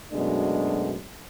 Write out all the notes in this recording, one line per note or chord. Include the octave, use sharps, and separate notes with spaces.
F#2 B2 G#3 A3 D4